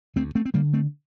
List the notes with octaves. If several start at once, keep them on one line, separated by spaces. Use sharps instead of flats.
D2 A3 C4
A3 C4
C4
D3 G3 A#3
A3 C4